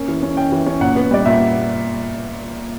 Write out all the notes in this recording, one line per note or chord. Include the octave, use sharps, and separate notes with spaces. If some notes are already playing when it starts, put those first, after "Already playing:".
Already playing: A#3 C#4
E3
C#4
C#4 G5
E3
C#4
A#2 F#5
B3
G3 D5
A#2 E5